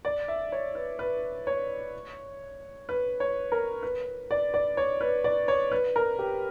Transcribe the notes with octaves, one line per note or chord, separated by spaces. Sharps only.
D5
E5
C#5
B4
B4
C#5
B4
C#5
A#4
B4
D5
D5
C#5
B4
D5
C#5
B4
A#4
G4